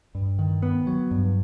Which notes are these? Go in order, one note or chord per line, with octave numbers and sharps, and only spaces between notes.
G2
D#3
B3
F#3
G2